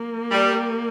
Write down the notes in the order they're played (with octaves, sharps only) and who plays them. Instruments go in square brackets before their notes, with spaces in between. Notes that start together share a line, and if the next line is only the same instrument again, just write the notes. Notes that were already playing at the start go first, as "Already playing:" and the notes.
Already playing: [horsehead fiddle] A#3
[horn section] G3